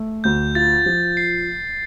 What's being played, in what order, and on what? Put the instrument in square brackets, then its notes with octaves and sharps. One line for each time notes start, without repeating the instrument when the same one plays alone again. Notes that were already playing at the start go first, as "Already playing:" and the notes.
Already playing: [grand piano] A3
[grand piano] D2 [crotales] G6
[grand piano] F4 [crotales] A6
[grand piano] F3
[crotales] C7